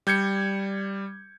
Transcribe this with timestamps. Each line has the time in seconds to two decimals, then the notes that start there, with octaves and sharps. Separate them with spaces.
0.07 G3 G6 G#6 C#7